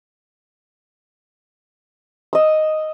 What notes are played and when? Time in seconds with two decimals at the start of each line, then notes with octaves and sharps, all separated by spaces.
2.33 D#5 E6